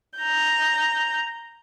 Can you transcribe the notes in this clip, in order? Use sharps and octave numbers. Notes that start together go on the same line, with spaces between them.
A#5 G6